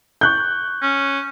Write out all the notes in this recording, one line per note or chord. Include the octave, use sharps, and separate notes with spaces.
C#6 F#6 G6
C#4